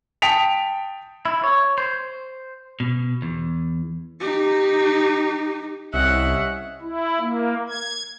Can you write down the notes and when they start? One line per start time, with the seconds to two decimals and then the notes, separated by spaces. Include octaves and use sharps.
0.22 G5 A5 D#6 B6 D7 F7
1.25 E4
1.44 C#5
1.78 C5
2.80 B2
3.22 E2
4.20 D#4 G4
5.94 C2 C#4 D#5 E5 F#5
6.81 E4
7.20 A#3
7.69 G#6